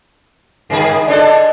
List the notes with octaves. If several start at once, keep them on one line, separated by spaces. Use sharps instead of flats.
G2 D#3 G#4
G#3 D4 A4 D5 D#5
D#5